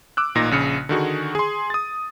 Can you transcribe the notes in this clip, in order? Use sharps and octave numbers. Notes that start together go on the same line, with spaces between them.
D6 E6 F#6
A1 A#2 D#4 A#6
A#1 C#3 C#7
D3 D#3 F#4 G#4
G#4 C6
D#6 A6